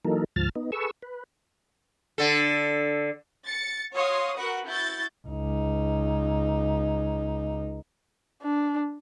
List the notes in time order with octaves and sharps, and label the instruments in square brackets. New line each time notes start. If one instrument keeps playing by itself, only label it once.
[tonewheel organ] E3 F#3 A#3 D#4 A4 A#4
D2 G#2 F3 A5 F6 A6
B3 D#4
G#4 A4 B4 C#6 E6
B4
[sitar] D3 A4
[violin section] A6 C#7
F#4 C#5 F5 C6 D#6
F#4 A#4 B4 F#5
E4 F#4 G6 A6
[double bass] C#2 D#4
[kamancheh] D4